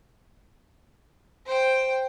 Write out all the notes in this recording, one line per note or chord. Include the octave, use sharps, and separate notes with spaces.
C5 G5